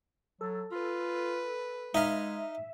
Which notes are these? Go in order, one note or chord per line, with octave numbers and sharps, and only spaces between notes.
F#3 A4
F4 B4
G#3 D#4 E5 F5